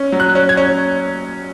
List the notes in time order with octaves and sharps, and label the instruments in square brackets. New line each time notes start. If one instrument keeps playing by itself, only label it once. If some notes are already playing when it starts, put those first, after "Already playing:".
Already playing: [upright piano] C#4
F#3
F#6
C#4
G#6
C#4